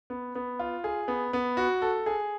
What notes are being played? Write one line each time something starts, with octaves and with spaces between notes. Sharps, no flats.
B3
B3
F4
G#4
B3
B3
F#4
A4
G#4